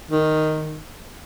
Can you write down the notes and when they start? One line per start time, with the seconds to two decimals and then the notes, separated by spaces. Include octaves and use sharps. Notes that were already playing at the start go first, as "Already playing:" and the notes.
0.11 D#3